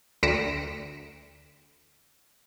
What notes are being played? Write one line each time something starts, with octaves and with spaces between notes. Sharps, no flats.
D2 A#6 B6 C#7 D7 E7